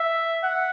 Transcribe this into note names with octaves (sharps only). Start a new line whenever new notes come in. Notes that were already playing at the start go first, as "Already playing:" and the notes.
Already playing: E5
F#5